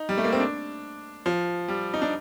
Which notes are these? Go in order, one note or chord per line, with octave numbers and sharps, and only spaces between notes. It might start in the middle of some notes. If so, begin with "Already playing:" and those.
Already playing: D#4
G3
A3
A#3
C4
D4
F3
G3
D#4
D4